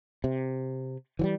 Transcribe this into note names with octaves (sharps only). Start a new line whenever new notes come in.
C3
E3 F3 G3